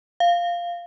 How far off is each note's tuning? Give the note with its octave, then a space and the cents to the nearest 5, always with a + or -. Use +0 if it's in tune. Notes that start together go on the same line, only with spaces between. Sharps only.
F5 -5